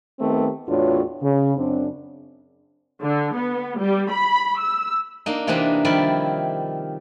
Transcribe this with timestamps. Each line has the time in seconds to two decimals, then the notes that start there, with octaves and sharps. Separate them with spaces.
0.20 D#3 A3 B3 C4 G4
0.68 E2 A2 D4 F4 F#4 C#5
1.21 C#3
1.57 F#2 C4 D4
3.03 D3
3.36 B3
3.80 G3
4.10 B5
4.61 E6
5.26 A#3 D4 D#4
5.47 C3 E3 A#3 C4 D4 D#4
5.85 D#3 F3 G3 E4 D5